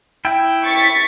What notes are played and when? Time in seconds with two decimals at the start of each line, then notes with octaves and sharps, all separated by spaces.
0.25 E4 G5
0.64 C#6 A6 B6